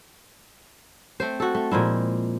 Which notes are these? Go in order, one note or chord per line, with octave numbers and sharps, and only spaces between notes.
A3 C4 C5
F#4 A4
A3
A#2 F3 G#3 E4